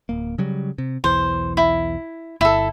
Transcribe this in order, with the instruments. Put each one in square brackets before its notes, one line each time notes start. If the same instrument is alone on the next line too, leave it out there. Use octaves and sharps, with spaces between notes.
[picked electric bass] D1 A#3
C#3 F#3 G3
C3
[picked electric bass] B1 E2 E3 [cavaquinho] C5
[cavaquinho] E4
[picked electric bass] G1 [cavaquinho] E4 A4